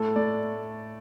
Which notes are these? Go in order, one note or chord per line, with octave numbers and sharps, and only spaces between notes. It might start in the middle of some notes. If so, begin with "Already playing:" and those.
Already playing: A2 A3 A4
A2 D5